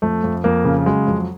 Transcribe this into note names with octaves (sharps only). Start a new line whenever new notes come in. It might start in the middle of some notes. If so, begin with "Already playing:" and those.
F2 A3
F2
F2 A#3
C#3
F#3 G#3
F2